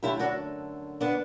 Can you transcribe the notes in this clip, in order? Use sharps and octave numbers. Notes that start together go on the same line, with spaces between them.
F#2 D3 A3 E4 G4
D4 F#4
B3 D4